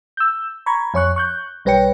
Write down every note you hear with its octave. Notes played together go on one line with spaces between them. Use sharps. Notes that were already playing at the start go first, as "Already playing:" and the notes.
E6 G6
A#5 B5 C#6 G#6
F2 C#5 C#6 F#6
C#6 F#6 G6
B1 G3 B4 C#5 G5 C#7